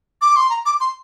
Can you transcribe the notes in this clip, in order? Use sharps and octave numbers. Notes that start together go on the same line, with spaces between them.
D6
C6
A#5
D6
C6